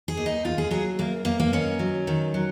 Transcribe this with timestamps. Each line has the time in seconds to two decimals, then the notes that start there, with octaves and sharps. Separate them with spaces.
0.08 G#4
0.17 D#2
0.26 D#4
0.44 D#2 F4
0.58 G#4
0.71 F#3 G#4
0.99 F#2 A#3
1.25 F#2 A#3
1.40 A#3
1.53 D#3 C#4
1.79 F#3
2.07 D#3
2.34 F#3